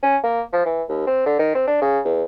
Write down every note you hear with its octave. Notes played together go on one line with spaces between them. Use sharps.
C#4
A#3
F3
E3
D#2
C4
D3
D#3
C4
D4
C#3
E2